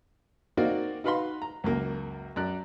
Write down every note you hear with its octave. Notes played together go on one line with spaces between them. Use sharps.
A#3 C4 D#4 F#4 D5 F5
D#4 F#4 B4 F5 B5 C6
A#5
C#2 F#2 A#3
F#2 D5 F#6